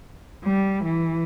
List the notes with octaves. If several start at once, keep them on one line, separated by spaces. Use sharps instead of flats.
G3
E3